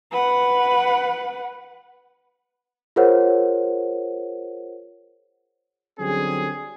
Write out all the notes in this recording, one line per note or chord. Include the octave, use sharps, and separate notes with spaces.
B4 F#5
F4 G#4 A#4 C5 C#5 F#5
D3 F#3 G3 C4 C#4 G#4